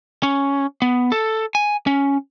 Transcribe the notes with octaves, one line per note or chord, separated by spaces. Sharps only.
C#4
B3
A4
G#5
C#4